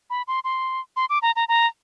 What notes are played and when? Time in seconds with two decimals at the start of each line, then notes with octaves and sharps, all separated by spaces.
0.10 B5
0.28 C6
0.44 C6
0.96 C6
1.10 D6
1.22 A#5
1.36 A#5
1.48 A#5